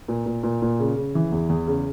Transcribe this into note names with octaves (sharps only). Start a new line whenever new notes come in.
A#2
A#2
A#2
A#2
C#3
C#3
E3
E2
E2
C#3